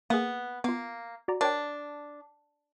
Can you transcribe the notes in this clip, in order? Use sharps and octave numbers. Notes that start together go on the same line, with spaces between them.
A#3 B3 G#4
A#3 B3 F4
F#4 D5 A#5
D4 A#4 C#5 G5